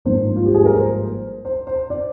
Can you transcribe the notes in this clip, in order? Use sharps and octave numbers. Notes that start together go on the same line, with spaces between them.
G#1 G2 F3 A#3 D#4 C5
F4
G4
G#4
A#4
C5
C5
C5
D5